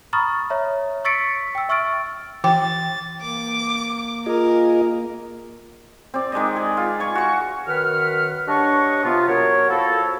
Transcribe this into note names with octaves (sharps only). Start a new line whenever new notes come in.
A#5 B5 C#6 D#6 F6 A6
C#5 E5 A#5
C#6 E6 A6 B6 C#7 D7
G5 E6
E5 C#6 E6 F6 A6 D7
E3 G5 A6
A#3 D6
F4 G#4 A#4 D#5
C4 D5
D#3 G#3 D5 D#5
G#4
F4
G#5 C#6
F#4 C#6
F#2 D#3 B4 F#5 F6
G2 D4 C#5 D#5 F#5 C#6
C3 B3 F4
F#3 B3 A#4 C#5
F3 E4 F#4 A4